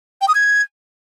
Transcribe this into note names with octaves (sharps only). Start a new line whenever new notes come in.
G5
D#6
G#6